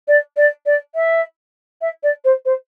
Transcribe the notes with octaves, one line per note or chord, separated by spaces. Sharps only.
D5
D5
D5
E5
E5
D5
C5
C5